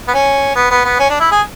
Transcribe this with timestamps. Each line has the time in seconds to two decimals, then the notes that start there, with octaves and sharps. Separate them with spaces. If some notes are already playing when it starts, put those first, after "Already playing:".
0.08 B3
0.14 C#4
0.56 B3
0.71 B3
0.85 B3
1.00 C#4
1.10 D4
1.20 E4
1.31 G#4